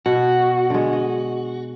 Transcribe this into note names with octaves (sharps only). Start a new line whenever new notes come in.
B2 F#4
D3 G#3
D#5